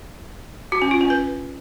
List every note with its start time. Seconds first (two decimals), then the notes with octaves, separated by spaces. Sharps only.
0.72 F#4
0.82 C#4
0.91 F4
1.01 C#4
1.10 B4